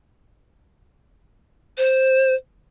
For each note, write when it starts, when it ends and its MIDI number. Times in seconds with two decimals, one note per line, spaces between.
1.78 2.35 72